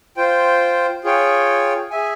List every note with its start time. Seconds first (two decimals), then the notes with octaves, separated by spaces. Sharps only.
0.17 F4 C5 G5
1.04 F4 G#4 C#5 G5
1.90 G#4 E5 G#5